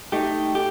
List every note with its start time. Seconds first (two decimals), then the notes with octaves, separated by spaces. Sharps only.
0.12 A3 D#4 G4
0.55 G4